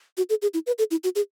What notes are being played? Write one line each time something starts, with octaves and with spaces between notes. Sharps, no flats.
F#4
A4
G#4
E4
B4
A4
E4
F#4
G#4